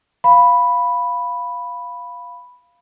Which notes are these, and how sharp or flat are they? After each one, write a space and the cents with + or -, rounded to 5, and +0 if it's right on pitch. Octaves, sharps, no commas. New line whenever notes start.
F5 +0 B5 +0